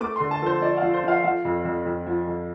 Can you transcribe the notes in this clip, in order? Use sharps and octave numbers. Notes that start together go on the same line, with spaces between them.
A3 D6
C6
D3
A5
F3 A4 C5
F3 D5
F5
F3
C5
F3 F5
F3 F5
F2
F2
F2
F3
F2